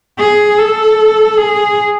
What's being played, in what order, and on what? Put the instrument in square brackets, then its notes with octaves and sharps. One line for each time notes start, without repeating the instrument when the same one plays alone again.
[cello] G#4
A4
G#4